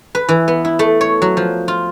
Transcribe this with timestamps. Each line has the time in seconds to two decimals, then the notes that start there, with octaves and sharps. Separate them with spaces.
0.15 B4
0.29 E3
0.48 B3
0.65 E4
0.79 A3
1.01 C#5
1.22 F#3
1.37 F3
1.68 F4